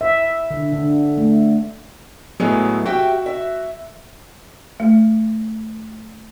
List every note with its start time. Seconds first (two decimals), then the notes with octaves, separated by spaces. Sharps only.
0.01 E5
0.51 D3
0.73 D3
1.18 A3
2.40 A2 F#3 G#3 A3 B3 G#4
2.86 F#4 G4 E5 G5
3.26 E5
4.80 A3